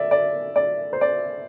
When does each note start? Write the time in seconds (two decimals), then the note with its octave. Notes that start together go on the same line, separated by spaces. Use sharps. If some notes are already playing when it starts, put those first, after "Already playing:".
Already playing: D5 E5
0.11 D5
0.56 D5
0.93 C5
1.01 D5